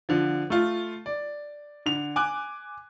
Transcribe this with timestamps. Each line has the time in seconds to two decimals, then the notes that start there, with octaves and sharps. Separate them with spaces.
0.09 D3 F3
0.50 A3 F4
1.06 D5
1.86 D3 F7
2.16 G#5 D6 F#6